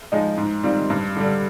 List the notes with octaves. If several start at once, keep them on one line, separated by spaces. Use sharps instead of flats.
F3 G#3 D#4
G#2
D#3 G3 C4 F4
G2
D3 G3